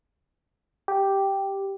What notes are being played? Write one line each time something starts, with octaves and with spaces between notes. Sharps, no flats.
G4